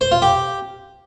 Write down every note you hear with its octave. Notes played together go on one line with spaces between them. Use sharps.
C5
F4
G4